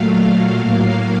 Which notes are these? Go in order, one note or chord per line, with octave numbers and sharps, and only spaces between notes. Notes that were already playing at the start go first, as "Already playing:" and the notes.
Already playing: A#2 F#3 A3 F5
A2 F#3 A#3 F5